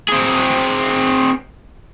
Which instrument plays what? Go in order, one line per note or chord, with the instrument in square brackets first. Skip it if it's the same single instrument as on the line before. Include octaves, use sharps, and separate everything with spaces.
[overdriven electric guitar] C4 G#4